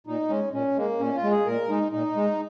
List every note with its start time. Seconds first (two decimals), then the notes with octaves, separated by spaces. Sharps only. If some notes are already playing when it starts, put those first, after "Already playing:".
0.07 A#2 D#4
0.30 G#3 C#4
0.53 A#2 C#4
0.76 G#3 A#3
1.00 A#2 C#4
1.16 F4
1.23 G#3
1.31 G#4
1.46 A#2 A#4
1.69 G#3 D#4
1.92 A#2 D#4
2.16 G#3